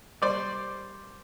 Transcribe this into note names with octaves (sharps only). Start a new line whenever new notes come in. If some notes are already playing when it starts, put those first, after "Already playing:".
G3 C5 D5